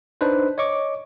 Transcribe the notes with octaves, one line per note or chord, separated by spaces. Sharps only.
D4 D#4 B4 C5
C#5 D#5 C#6 D6